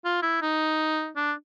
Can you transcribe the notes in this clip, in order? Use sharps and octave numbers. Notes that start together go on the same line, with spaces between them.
F4
E4
D#4
D4